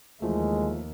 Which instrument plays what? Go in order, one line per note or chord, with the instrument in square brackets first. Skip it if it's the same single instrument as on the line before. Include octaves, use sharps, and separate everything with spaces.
[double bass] D#2 [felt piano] E3 F3 A3 [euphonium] G#3